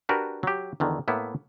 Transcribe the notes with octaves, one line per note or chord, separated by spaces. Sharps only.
D4 F#4 G4 A#4 B4
F#3 G4
E2 D3 D#3
A2 A#3 B3 E4